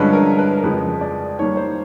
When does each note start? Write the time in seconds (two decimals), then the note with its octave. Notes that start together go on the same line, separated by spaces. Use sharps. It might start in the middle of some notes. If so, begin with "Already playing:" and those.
Already playing: G2 D3 F3 G#3 C#4 B4
0.13 A#4
0.39 B4
0.58 A#4
0.63 F2 C#3 F3 G#3 B4
1.01 D5
1.39 D#3 G3 A#3 C#5
1.57 C5